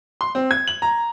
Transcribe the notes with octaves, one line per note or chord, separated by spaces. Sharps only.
C6
C4
G#6
F#7
A#5